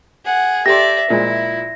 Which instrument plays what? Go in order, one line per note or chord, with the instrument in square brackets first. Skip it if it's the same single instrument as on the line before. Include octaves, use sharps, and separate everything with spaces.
[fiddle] G#4 F#5
[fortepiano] G4 A4 C6 [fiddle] D5 E5 [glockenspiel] A#6
[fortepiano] A#2 F3 G#3 [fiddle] E4